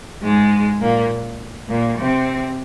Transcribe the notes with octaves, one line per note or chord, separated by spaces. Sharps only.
G#2 G#3
A#2 A#3
A#2 A#3
C3 C4